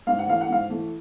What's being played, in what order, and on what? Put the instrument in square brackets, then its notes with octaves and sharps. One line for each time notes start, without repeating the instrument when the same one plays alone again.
[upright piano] G#2 F5
F#5
E3 A3 F5
F#5
G#2 F5
E3 A3